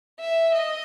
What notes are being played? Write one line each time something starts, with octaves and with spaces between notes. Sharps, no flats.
E5
D#5